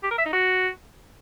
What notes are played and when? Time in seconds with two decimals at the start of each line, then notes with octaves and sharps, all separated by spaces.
0.03 G4
0.11 A#4
0.18 E5
0.25 D#4
0.33 F#4